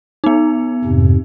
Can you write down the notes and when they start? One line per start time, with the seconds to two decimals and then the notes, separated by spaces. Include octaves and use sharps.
0.24 B3 D#4
0.85 F2 G#2 C3